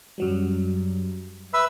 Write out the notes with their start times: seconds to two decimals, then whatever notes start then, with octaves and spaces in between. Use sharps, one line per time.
0.18 F#2 F#3 G3
1.54 B4 E5 B5 E6